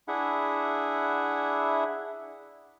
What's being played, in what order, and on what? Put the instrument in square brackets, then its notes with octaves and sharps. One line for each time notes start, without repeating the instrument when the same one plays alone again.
[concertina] D4 E4 G#4 E5 F#5